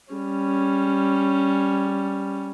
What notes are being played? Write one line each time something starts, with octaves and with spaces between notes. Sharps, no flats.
G3 C#4